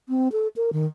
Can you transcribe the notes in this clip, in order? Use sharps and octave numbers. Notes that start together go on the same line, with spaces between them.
C4
A4
A#4
D#3